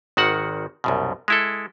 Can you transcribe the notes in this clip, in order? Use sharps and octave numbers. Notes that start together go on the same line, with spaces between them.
G#1 D#3 F#4 F#5
C2 F#2 B2
G#3 E4 A4